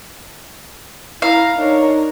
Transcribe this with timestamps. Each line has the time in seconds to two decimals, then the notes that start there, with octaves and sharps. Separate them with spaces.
1.22 E4 F5 A#5
1.56 D4 D#4 A#4 C#5